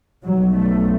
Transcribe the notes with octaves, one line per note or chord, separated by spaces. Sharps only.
B1 B2 F#3
A3